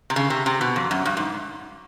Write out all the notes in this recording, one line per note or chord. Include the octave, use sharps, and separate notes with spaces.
C3
C#3
C3
C3
B2
F2
F#2
G2
G#2